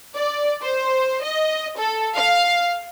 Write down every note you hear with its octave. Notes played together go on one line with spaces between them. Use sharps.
D5
C5
D#5
A4
F5